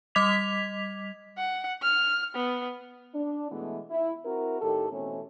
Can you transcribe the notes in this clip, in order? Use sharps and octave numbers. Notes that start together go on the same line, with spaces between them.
G3 D#5 D6 G#6 B6 F7
F#5
F6
B3
D4
B2 E3 G#3 A3 B3
E4
C4 E4 F#4 A#4
A2 D#3 G4 A4
B2 E3 A3 C4 C#4